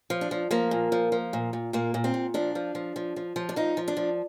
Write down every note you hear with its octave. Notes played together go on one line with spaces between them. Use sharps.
F3
D4
F3
F3 A#3
A#2
F3
F3
A#2
A#2
A#2 A#3
A#2
C4
A#2
F3 D4
F3
F3
F3
F3
F3
D4
F3 D#4
F3
D4
F3